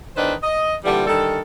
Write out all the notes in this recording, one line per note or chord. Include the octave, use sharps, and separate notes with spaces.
E2 D#3 D4 B4 C5 D#5
D#5
A#2 D3 E3 G3
D3 D#3 G3 A4